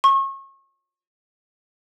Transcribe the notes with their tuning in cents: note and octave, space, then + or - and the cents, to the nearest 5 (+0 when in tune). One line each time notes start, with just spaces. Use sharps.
C#6 -35